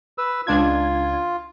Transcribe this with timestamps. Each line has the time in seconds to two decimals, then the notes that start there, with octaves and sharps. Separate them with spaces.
0.18 B4 E6
0.47 C#2 D4 F4 G#6